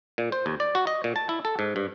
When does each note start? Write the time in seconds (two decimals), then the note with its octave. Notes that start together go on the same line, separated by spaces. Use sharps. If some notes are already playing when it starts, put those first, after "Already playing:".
0.18 A#2
0.32 C5
0.46 D#2
0.60 D5
0.75 F#4
0.87 D#5
1.04 A#2
1.16 A5
1.29 E4
1.45 A4
1.59 G#2
1.76 G2